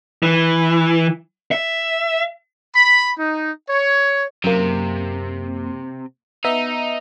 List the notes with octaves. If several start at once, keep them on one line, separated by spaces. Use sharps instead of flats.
E3
E5
B5
D#4
C#5
F#2 C3 A#3
B3 D#4 E5